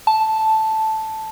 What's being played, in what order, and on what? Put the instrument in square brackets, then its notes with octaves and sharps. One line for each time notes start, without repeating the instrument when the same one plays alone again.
[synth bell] A5